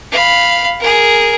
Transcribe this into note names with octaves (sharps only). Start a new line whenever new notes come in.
F5 B5
G#4 A#4